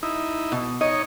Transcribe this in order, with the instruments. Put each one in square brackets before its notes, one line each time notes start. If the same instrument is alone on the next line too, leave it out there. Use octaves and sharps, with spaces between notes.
[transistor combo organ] D#4 E4
[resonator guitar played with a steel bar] B2
[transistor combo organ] D#4 C#5 [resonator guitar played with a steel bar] D#5